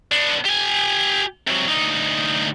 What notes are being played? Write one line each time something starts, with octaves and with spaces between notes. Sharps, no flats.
B3 D4
G4 G#5
C3 F#3
D2 D#4